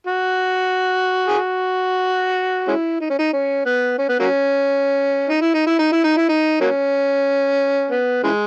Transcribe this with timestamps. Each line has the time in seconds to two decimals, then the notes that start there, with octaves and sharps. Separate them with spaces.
0.07 F#4
1.28 G#4
1.38 F#4
2.68 G#3 C#4 E4
3.00 D#4
3.10 C#4
3.19 D#4
3.33 C#4
3.65 B3
3.99 C#4
4.09 B3
4.20 F#3 A#3 C#4
5.29 D#4
5.42 E4
5.54 D#4
5.67 E4
5.79 D#4
5.92 E4
6.04 D#4
6.17 E4
6.29 D#4
6.61 F#3 A#3 C#4
7.91 B3
8.23 C#3 E3 G#3